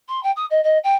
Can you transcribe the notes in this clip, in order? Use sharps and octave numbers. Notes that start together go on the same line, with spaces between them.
C6
G5
D#6
D#5
D#5
G5